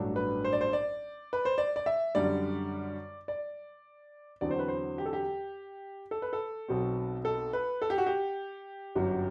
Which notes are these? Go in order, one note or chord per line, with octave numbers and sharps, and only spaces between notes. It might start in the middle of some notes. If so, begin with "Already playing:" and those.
Already playing: A1 G2 F#3 A3 D4
B4
C5
D5
C5
D5
B4
C5
D5
D5
E5
F#2 D3 G3 D5
D5
E2 D3 F#3 C4 D5
C5
B4
C5
G4
A4
G4
A4
B4
A4
B1 B2 F#3 C4
A4
B4
A4
G4
F#4
G4
G1 F#2 F#3